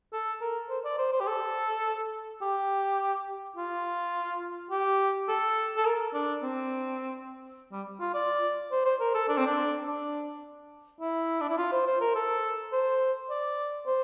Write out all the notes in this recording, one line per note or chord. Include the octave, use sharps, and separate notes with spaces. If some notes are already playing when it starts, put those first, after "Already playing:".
A4
A#4
C5
D5
C5
C5
G4
A4
G4
F4
G4
A4
A4
A#4
D4
C4
G3
F4
D5
C5
C5
A#4
A4
D4
C4
D4
D4
E4
D4
E4
F4
C5
C5
A#4
A4
C5
D5
C5